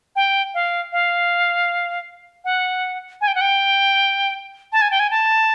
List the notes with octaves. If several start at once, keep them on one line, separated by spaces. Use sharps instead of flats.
G5
F5
F5
F#5
G#5
G5
F#5
G5
A5
G#5
G5
G#5
A5